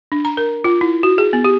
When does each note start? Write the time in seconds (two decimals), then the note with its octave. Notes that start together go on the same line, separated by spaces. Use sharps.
0.12 D4
0.25 A#5
0.37 A#4
0.64 F4
0.81 E4
1.03 F#4
1.18 G#4
1.33 B3
1.44 G4